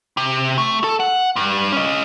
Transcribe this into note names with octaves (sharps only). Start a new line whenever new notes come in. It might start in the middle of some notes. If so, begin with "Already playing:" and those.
C3
A3
A4
F#5
G2
C#4 D#5